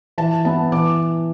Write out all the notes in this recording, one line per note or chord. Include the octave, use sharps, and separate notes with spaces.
E3 A5
B3 E4 A5
E3 D6